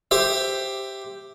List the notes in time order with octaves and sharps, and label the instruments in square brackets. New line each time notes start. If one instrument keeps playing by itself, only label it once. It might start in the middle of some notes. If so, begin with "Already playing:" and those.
[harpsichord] G4 C5 E5